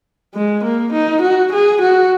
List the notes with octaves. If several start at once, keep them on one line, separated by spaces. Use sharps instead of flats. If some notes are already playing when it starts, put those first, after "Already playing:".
G#3
A#3
D#4
F#4
G#4
F#4